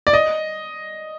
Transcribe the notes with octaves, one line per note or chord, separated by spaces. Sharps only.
D5
D#5